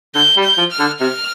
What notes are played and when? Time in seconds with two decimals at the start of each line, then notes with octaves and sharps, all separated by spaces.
0.15 D3 G6
0.37 G3
0.44 G6
0.58 F3
0.71 F6
0.79 D3
1.00 C3 F6